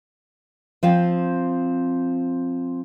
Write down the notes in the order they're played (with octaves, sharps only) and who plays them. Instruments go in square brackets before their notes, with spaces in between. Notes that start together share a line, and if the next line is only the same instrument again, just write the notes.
[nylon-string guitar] F3 C4 F5